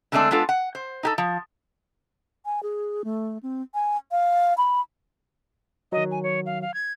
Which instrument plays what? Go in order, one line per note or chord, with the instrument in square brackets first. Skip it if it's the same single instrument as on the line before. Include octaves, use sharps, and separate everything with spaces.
[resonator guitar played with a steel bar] D3 G#3 A3 C4 D4 A4
G#3 B3 D4 F4 A4
F#5
C5
D#4 G4 A4
F3
[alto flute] G#5
G#4
A3
C4
G#5
F5
B5
[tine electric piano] D#3 F#3 [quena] D#5
[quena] G#5
C#5
F5
F5
G#6